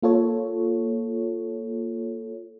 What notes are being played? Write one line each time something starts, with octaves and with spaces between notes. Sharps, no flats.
A#3 F4 A4 C#5